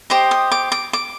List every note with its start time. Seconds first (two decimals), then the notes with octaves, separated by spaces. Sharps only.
0.10 G4 C5 D#5 D6
0.31 D#6
0.52 D6
0.72 D6
0.93 D6